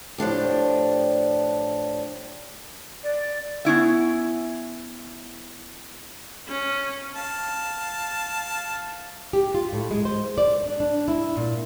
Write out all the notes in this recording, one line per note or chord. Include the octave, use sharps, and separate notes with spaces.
A2 F3 D4 G4
D5
B3 C#4 E4 E5
C#4
F5 A5
G4
F4
A2
G#3
C5
D5
D4
D4
E4
A#2